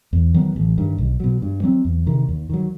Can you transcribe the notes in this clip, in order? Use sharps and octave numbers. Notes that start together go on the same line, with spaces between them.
E2
D#3 F#3 B3
A1
G2 D#3
B1
B2 F#3
G2
F#3 C4
E2
C3 D#3
D#2
D#3 F#3